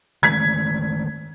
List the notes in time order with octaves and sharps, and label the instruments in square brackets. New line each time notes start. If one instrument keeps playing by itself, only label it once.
[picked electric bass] D#3 G#3 A3 [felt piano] G#6 B6